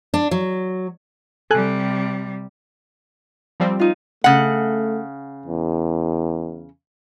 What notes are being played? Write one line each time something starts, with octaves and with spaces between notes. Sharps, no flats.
D4
F#3
C3 G3 A4 G#5 F#6
F3 G3 C4
D#4 F4
C#3 A3 F#5
E2